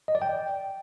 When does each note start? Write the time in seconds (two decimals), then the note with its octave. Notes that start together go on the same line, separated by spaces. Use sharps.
0.08 D#5
0.15 D5
0.22 G5